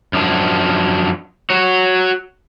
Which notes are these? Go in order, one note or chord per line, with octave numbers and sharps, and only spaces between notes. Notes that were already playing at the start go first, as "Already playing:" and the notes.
F#2 F3 D4
F#4 C#5